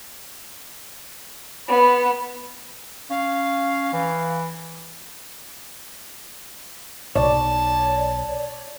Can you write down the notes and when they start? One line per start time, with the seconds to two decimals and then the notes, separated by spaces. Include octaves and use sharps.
1.68 B3 B5
3.10 C#4 F5
3.93 E3
7.15 B1 C#5 D5 A5